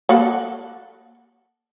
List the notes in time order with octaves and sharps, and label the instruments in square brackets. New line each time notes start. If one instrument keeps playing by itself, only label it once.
[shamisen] A#3 A4 F#5